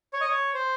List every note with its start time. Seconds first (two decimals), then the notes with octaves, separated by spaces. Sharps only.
0.13 C#5
0.21 D#5
0.28 C#5
0.54 C5